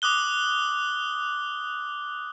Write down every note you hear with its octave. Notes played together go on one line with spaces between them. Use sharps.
D6 D#6 F#6 G7